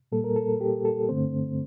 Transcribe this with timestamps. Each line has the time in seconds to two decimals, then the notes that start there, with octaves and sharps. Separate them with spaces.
0.12 A#2 G3 A#3 A4
0.24 A#4
0.36 A4
0.61 G4
0.85 A4
1.09 G2 D3 A3 C4 C5